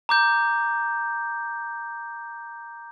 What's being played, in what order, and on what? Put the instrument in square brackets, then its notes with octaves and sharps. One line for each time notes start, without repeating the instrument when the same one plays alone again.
[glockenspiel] A#5 D6 G6